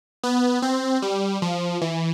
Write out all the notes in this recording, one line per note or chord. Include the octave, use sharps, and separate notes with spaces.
B3
C4
G3
F3
E3